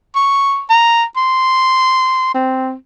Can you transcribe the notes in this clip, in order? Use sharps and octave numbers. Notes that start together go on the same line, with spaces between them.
C#6
A#5
C6
C4